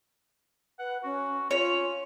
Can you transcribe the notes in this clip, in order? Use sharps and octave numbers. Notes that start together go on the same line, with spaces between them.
B4 F#5
C#4 F#4
C#4 F4 C#5